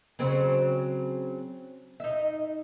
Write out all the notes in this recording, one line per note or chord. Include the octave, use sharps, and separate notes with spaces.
C#3 F#3 C4
D#4 E5